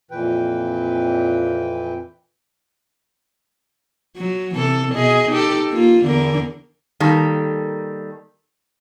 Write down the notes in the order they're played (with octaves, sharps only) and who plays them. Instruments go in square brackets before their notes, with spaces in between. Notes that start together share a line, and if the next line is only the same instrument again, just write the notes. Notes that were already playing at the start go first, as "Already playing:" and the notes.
[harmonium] F2 A#2 E3 B4 G5
[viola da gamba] F#3
C3 E3 A4
B2 G#4 D#5
D#4 G4 A4
A#3 F4
E2 D3 A#4
[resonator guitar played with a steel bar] D#3 G3 A#3 A4